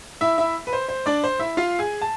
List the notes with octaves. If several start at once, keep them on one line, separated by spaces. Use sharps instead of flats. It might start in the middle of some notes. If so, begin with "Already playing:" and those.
E4 E5
E4 E5
B4
C5
C5
D4 D5
C5
E4 E5
F4 F5
G#4 G#5
A5